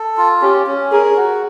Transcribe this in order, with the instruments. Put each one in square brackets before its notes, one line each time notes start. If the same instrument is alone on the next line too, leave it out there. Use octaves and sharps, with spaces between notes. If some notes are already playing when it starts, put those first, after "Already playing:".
Already playing: [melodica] A4
F4
[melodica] C#4 [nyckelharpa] G4
[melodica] C#4
[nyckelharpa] G#4 [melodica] A#4
[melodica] F#4